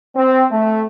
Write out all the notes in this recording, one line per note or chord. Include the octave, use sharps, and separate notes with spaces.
C4
A3